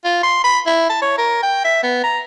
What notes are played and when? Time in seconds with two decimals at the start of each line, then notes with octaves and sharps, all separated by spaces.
0.05 F4
0.23 C6
0.44 B5
0.66 E4
0.90 A5
1.02 C#5
1.18 A#4
1.43 G5
1.64 E5
1.83 B3
2.03 A#5